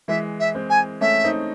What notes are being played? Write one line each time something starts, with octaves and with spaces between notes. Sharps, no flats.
E3 G#3 E5
E5
G#3 C4
G#5
A3 C#4 E5
C4 D#4